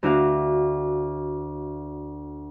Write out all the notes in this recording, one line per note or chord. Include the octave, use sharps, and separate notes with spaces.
D2 E4 F#4 F5